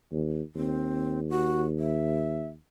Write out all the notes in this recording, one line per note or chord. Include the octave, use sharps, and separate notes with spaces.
D#2
D#2 C4
F#4
E5